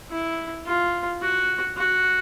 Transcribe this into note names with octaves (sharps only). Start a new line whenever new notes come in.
E4
F4
F#4
F#4